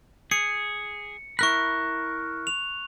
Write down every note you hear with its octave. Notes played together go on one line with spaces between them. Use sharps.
G#4 C#7
E4 A#4 B5 C#6 F#6
F7